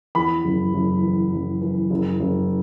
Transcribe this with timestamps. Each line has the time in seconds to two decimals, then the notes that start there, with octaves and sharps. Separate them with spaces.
0.15 E2 B5
0.45 F#1
0.74 F#1
1.02 E3
1.32 F#1
1.61 E3
1.90 F#1
2.20 F#1